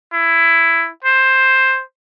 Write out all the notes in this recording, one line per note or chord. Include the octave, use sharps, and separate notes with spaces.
E4
C5